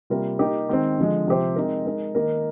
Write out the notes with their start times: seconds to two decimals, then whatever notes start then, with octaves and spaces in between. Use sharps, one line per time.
0.10 C3 G3 A#3 F4 A#4
0.39 A#3 D#4 G4
0.69 D#3 G#3 C4
0.98 D3 F3 G#3
1.27 C3 F3 C4 G4 C5
1.56 G#3 C4 D#4 A#4
1.86 G#3 D#4 A#4
2.15 D#3 A#3 D#4 A#4